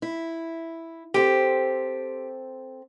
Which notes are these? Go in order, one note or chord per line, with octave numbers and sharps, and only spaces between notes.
E4
C4 G4 A4 C5